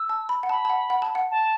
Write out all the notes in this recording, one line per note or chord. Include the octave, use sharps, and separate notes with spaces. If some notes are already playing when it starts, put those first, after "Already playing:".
Already playing: E6
A5
B5
F#5
A5 B5
A5
F#5
F#5
A5
F#5
A5